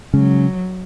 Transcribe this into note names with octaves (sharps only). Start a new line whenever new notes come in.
C#3 F#3 G#3 C#4